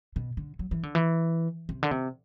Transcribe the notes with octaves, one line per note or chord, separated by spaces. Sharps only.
B2
D3
F#3
E3
D3
E3
C3
D3
C3